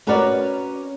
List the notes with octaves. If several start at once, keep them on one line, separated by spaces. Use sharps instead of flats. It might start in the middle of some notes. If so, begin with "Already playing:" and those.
C#4 F#4 A#4 B4 C#5 D5